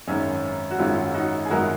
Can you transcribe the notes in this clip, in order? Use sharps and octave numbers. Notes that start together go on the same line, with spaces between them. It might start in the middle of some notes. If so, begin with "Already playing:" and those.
G#1 F#2 D#3 G#3 C#4
F#4
G#1 F#2 D#3 G#3 C#4 F4
D#4 F#4
G#4
G#1 F#2 D#3 G#3 F#4 A#4